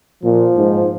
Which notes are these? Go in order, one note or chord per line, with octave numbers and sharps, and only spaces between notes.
A#2 F3
G#2